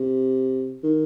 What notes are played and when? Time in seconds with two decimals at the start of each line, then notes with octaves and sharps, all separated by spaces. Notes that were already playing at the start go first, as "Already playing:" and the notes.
Already playing: C3
0.84 D#3